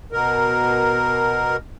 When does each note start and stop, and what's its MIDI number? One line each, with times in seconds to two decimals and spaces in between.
0.12 1.56 47
0.12 1.56 70